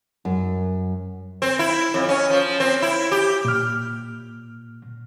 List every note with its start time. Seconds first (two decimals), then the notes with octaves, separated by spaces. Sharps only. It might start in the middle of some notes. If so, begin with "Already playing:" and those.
0.25 F#2
1.42 C4
1.59 E4
1.94 F2
2.09 C#4
2.30 F3
2.60 C4
2.82 E4
3.12 G4
3.45 A#2 F6